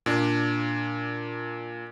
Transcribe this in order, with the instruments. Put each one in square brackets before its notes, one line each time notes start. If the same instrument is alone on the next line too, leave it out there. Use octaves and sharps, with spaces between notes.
[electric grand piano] A#2 D4